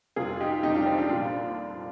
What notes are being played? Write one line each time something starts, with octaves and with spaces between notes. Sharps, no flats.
F2 C3 G3 F4 G#4
D#4 G4
F2 C3 G3 D#4 G4
D4 F4
C4 D#4
D4 F4
C2 A#2 F3 D4 F4